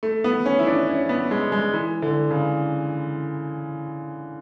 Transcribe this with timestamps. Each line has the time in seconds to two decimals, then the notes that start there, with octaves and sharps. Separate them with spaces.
0.03 A3
0.24 B3
0.46 C#4
0.59 E4
0.67 D4
0.88 C#4
1.09 B3
1.31 G#3
1.52 G#3
1.74 E3
2.02 D3
2.31 C#3